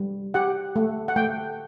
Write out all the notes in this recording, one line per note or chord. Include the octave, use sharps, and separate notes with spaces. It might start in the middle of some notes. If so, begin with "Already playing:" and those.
Already playing: G3
G4 F#5
A3
F#5
A3 G5